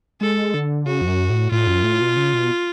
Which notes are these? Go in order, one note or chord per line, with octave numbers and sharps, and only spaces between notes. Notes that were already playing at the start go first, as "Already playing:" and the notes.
G#3 A4
D3
C#3 F#4
F2
F#2
A2
A2 F4
F#2
A2
B2
C#3
B2